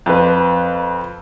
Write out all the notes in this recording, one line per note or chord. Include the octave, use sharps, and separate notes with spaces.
F2 B4